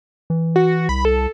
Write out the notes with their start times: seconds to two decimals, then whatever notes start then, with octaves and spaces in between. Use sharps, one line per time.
0.30 E3
0.56 F#4
0.89 C2 B5
1.05 A4